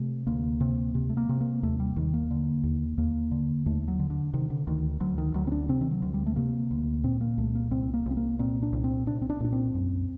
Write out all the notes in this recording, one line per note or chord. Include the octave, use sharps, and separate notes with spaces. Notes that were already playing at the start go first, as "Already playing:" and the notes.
Already playing: C3 A3
D2 A#3
C3
C3
A3
A#3
C3
A#3
D#2 A3
G3
D#2 D#3
A#3
D3
D#2
D#2 A#3
D3
D#2 A3
F#3
D3
D3
C3 D#3
D3
D2 D#3
D2 F#3
D#3
D2 F#3
C4
D4
C3 C4
D#3
F#3
D2
G3
A3
C3 A#3
D2
A#2 C4
A#3
C2 A3
A#3
C2 C4
A#3
C2 C4
A#3
A#2 C4
D4
C2
C4
C2 D4
C4
D4
A#2 D4
C4
F#2